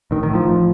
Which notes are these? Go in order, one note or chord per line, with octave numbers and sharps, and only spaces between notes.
A1 D#3
D#3
A2
F3
A1